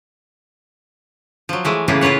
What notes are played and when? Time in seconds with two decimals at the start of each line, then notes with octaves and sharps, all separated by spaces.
1.49 F3 F#3
1.65 E3 G#3 A3
1.88 A2 C#3 E3 A#3 B3
2.01 E3 F4 B4 C#5 F#5